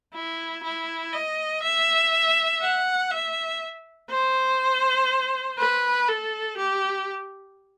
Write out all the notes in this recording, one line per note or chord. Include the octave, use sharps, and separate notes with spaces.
E4
E4
D#5
E5
F#5
E5
C5
B4
A4
G4